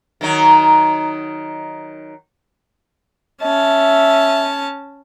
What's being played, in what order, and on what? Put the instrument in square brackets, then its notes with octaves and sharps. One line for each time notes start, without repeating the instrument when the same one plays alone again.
[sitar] D#3 F#3 D#4
[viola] C#4 A5 [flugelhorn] E5